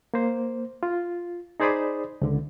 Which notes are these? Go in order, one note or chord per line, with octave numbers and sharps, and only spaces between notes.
A#3 C5
F4
D#4 G#4 C5 D5 B5 D#6
C#2 D3